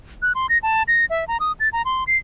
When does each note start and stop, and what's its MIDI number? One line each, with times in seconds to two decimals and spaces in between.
0.22 0.33 90
0.35 0.47 84
0.49 0.58 94
0.63 0.83 81
0.88 1.05 94
1.10 1.25 76
1.28 1.37 82
1.40 1.52 87
1.60 1.69 93
1.73 1.82 82
1.85 2.04 84
2.07 2.17 96